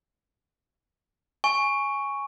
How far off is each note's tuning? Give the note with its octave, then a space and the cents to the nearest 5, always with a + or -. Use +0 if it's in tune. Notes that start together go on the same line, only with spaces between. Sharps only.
G#5 +0 C#6 +0